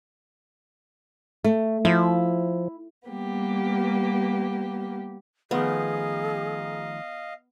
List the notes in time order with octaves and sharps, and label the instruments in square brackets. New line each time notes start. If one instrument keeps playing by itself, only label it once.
[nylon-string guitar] A3
[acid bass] F3 [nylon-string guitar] E4
[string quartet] G3 A#3 B3 G4
[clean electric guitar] D#3 F3 A3 [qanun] B3 [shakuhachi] G#4 [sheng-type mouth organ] D#5 F5